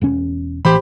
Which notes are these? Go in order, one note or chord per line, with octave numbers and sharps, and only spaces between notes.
E1 C#4
A1 E3 G4 C5 B5